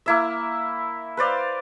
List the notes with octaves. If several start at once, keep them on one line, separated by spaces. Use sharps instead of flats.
A#3 E4 E5
B4 C5 D5 F5